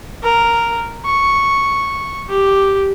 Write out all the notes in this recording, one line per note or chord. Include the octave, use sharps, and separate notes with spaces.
A#4
C#6
G4